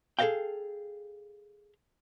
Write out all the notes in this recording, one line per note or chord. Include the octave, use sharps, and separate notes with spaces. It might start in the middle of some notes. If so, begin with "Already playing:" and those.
G#4 A4 B4 D#5 F5 G5